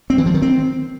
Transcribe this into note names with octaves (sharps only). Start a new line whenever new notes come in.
C4
E3
F3
D#3
C4